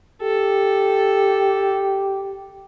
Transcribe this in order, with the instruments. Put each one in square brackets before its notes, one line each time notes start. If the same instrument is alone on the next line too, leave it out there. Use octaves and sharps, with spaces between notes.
[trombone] G4 [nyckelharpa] A4